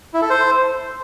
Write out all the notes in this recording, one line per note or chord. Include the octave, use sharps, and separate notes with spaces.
E4
A4
C5